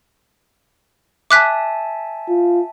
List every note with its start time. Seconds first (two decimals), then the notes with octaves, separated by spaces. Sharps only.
1.31 E5 G#5 A5 D6 F#6 B6
2.28 F4